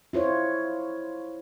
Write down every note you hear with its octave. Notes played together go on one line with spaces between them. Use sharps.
E4 F4 C5 C#5